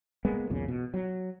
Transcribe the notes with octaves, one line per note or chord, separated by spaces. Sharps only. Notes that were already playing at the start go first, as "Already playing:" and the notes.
G#3 A#3 B3
B1 E2 A#2 C#3
B2
F#3